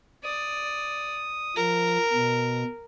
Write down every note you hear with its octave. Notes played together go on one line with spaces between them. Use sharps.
D5 D#6
F3 A#4
B2